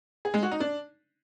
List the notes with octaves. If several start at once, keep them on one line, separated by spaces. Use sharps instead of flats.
G#4
G#3
F#4
D#4
D4